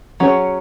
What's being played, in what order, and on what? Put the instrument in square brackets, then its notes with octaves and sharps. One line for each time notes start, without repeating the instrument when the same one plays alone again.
[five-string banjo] F#3 C#4 G#4 C#5